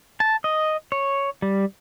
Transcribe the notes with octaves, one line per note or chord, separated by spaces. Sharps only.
A5
D#5
C#5
G3